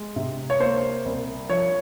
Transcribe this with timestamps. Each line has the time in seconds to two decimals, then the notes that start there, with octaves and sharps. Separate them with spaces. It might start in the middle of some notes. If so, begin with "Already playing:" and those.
Already playing: G#3
0.16 C3
0.50 C#5
0.60 A#3 C5
1.06 C2
1.49 F3 C#5